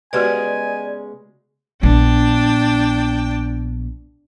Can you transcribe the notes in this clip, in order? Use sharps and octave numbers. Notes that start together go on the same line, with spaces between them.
C#3 G#3 B3 F#4 G4 B4 D5 G#5
A#1 B3 D4 G5